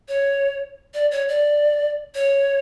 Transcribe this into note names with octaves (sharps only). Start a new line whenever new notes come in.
C#5
D5
C#5
D5
C#5